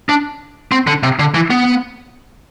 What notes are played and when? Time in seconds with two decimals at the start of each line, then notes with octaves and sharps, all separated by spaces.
0.09 D4
0.72 C4
0.87 D3
1.03 C3
1.19 D3
1.34 E3
1.50 B3